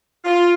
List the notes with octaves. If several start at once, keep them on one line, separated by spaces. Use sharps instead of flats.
F4